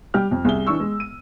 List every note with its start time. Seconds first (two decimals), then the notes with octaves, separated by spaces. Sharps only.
0.14 G3 G4 F6
0.31 F2
0.45 C2 G#4 E5 G7
0.67 E3 D4 C#6 E6
0.80 G#3
1.00 D#7